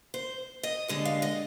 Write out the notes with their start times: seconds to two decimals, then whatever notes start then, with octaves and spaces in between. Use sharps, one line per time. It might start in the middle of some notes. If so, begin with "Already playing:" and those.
0.14 C5
0.63 D#5
0.88 D#2 D3 G#3 D#5
1.05 F5
1.22 D#5